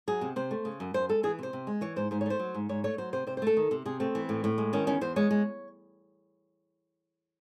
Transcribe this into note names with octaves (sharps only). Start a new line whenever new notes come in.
F#3 G#4
C3
C3 C5
A3
C#3
F#2
F#2 C5
G#3 A4
E3 G#4
C3 C5
C3
G#3
E3 C#5
G#2 C5
G#2 C5
C#5
A3 C5
F#3
G#2
G#2 C#5
A3 C#5
F#3 C5
C3 C5
C3 C5
C5
A3 A4
D#3
C3
C3 G#4
A3 C4
E3
A2
A2
G#3
D#3 C#4
E2 C#4
E2 C5
G#3 C#5
G#3